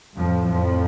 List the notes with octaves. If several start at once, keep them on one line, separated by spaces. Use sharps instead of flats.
F2 A2 F3
F2 F3